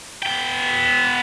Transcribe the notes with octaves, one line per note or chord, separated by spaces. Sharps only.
B3 G5